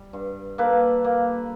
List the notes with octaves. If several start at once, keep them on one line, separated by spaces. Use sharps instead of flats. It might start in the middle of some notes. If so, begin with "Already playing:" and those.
Already playing: G3
G2
A#3 A4 B4
A#3